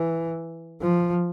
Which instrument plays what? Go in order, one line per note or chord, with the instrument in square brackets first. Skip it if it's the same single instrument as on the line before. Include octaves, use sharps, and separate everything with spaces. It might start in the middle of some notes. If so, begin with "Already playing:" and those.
Already playing: [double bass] E3
F3